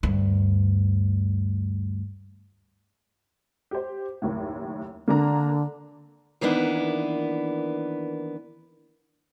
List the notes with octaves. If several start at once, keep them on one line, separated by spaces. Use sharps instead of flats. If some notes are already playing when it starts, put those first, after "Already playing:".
D2 G2
G4 C5
F#1 D#2 A2
D3 A#3 D4 A#5
D#3 E3 A#3 B3 D4 E4